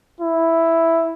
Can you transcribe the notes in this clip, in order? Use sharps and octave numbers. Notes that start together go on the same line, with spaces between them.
E4